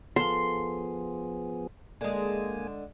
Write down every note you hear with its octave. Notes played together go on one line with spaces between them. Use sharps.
F3 B3 F4 G#4 A4 C6
D3 G#3 A#3 G#5